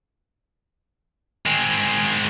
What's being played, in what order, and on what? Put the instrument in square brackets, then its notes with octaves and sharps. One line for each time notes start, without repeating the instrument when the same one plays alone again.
[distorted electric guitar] G#3 C4